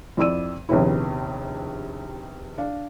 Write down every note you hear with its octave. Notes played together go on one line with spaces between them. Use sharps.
F2 E4 D5 E6 D#7
A#1 D#2 C3 B3 E4
D4 F5